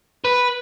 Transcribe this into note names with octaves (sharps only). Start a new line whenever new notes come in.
B4